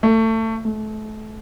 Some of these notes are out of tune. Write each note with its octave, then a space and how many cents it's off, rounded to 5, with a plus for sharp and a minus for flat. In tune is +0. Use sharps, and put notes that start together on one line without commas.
A3 +25
A3 -30